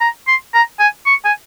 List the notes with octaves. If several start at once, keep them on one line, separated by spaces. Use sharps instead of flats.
A#5
C6
A#5
G#5
C#6
G#5